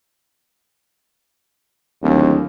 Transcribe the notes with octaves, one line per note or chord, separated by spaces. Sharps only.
D1 D#2